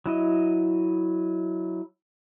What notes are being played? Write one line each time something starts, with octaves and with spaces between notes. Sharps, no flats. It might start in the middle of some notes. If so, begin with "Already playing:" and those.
F#3 E4 D#5